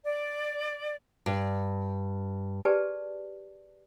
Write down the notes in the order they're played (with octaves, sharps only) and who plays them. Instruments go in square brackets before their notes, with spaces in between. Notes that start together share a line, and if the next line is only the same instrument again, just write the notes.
[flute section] D5
[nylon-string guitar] G2
[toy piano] G4 G#4 A#4 B4 D5 A5